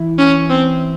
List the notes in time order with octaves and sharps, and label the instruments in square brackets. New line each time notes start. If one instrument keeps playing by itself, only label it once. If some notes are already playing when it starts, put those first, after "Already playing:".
Already playing: [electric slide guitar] E3 E4
[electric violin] C#4
C4